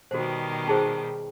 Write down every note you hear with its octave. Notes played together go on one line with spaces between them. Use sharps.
B2 D#3 G3 F#4 C5
D#4 G#4 C5